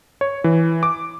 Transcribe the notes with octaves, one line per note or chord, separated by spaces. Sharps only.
C#5
E3
D6